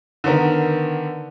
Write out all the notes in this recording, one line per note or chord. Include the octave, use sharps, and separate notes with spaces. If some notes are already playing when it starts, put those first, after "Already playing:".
D3 D#3 B3 A#4